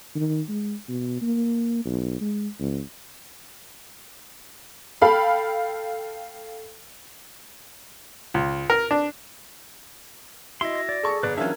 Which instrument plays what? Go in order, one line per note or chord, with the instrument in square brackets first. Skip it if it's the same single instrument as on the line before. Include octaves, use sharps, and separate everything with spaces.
[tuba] D#3
G#3
B2
A#3
B1
G#3
C#2
[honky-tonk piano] A4 F5 G5 B5
[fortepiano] C#2
A#4
D4
[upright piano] E4 [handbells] F#4 [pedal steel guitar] D#5 C6
[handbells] G#6 A#6
[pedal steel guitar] D5
[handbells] G#4 [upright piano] A4 C#6
[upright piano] G1 [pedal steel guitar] B4 D5
[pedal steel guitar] E3 F#3 [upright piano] C#4 F4 E5 [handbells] D4 A#4 G#6